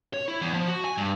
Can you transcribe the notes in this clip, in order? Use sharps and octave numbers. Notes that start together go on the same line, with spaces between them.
C#5
E4
E2
F3
F#4
G#5
G2